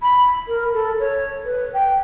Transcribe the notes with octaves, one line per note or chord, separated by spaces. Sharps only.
B5
A#4
A4
C#5
B4
G5